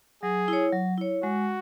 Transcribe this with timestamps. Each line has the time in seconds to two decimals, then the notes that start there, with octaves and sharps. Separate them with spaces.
0.23 F#3 G#4
0.48 E4 C#5
0.73 F#3
0.98 E4 C#5
1.23 G#3 F#4